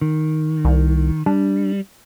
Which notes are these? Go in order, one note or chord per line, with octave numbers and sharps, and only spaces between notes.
D#3
C2
G3 D4